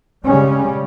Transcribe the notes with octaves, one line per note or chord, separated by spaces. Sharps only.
C#3 G3 G#3 C#4